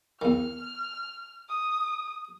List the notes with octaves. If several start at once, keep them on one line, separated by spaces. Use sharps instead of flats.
E2 D#3 F6
D#6